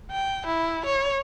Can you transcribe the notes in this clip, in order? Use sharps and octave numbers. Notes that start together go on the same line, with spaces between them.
G5
E4
C#5